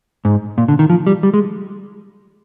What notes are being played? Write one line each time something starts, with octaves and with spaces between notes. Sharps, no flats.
G#2
A#2
D3
D#3
F3
G3
G3
G#3